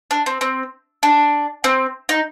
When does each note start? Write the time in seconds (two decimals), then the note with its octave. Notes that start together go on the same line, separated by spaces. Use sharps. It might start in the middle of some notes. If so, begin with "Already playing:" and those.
0.11 D4
0.26 C4
0.41 C4
1.03 D4
1.64 C4
2.09 D#4